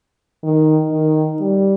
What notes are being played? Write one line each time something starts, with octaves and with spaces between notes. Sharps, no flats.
D#3
D#3
G3